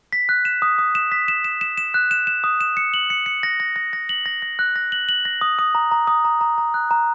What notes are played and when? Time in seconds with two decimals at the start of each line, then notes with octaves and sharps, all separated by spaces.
0.13 B6
0.29 F#6
0.45 E7
0.62 D#6
0.79 D#6
0.95 E7
1.12 B6
1.28 E7
1.44 E7
1.61 E7
1.77 E7
1.94 F#6
2.11 E7
2.27 E7
2.44 D#6
2.61 E7
2.77 C#7
2.94 F#7
3.10 C#7
3.26 C#7
3.43 A#6
3.60 A#6
3.76 A#6
3.93 A#6
4.09 F#7
4.26 A#6
4.42 A#6
4.59 F#6
4.76 A#6
4.92 F#7
5.09 F#7
5.25 A#6
5.41 D#6
5.59 D#6
5.75 A#5
5.91 A#5
6.07 D#6
6.25 A#5
6.41 A#5
6.58 A#5
6.74 F#6
6.91 A#5